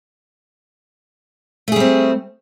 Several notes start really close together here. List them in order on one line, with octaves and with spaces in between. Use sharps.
A3 G#4 G3 C4